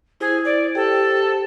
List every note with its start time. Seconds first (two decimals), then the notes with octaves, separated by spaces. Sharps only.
0.20 E4 G#4 C5
0.45 D5
0.75 G4 A4 C5 G5